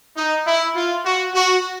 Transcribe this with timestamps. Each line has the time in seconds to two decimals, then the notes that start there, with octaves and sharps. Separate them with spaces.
0.17 D#4
0.46 E4
0.75 F4
1.05 F#4
1.35 F#4